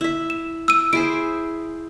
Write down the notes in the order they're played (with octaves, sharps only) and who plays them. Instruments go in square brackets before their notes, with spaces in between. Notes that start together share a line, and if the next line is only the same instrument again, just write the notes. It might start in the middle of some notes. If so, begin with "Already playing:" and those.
[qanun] E4 E5
[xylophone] E7
E6 D#7
[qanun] E4 G#4 C5 [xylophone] D7